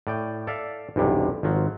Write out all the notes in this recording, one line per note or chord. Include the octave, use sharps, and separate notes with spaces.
A2 D5 G5
A4 D5 E5 F5
B1 E2 G2 C3
G#1 F3 F#3